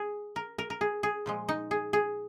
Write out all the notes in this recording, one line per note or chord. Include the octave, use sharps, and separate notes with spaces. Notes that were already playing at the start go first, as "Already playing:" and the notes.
Already playing: G#4
A#4
A#4
A#4
G#4
G#4
A#2 F3 G#3
D#4
G#4
G#4